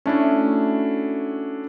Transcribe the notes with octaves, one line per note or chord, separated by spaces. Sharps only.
A3 C#4 D4 E4 F#4